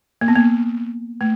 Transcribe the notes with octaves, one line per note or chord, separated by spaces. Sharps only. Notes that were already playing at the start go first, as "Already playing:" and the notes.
A#3
B3
A#3
A3